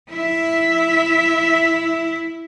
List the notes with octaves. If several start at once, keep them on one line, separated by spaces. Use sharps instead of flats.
E4 E5